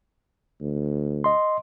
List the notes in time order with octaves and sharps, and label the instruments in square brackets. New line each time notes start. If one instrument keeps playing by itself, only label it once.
[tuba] D2
[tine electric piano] D#5 C6